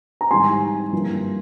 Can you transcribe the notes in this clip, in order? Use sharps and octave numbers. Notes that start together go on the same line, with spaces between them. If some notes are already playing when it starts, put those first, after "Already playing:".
A#5
G#2 E3 G3 C4 G#5 C6
G2 F3 A#3 E4